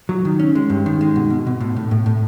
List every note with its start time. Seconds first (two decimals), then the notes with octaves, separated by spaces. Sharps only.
0.09 F#3
0.25 D#3
0.39 C#4
0.55 G#3
0.70 G2
0.86 D#3
1.01 G#3
1.16 B2
1.30 B2
1.47 B2
1.60 A2
1.76 A2
1.91 A2
2.06 A2